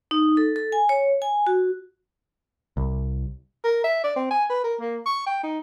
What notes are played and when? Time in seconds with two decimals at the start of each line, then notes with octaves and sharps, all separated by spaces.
0.11 D#4
0.37 A4
0.56 A4
0.72 G#5
0.89 C#5
1.22 G#5
1.47 F#4
2.77 C2
3.64 A#4
3.84 E5
4.04 D5
4.16 C4
4.31 G#5
4.50 B4
4.64 A#4
4.80 A#3
5.06 C#6
5.26 G5
5.43 D#4